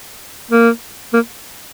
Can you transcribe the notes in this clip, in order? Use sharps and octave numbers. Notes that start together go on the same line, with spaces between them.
A#3
A#3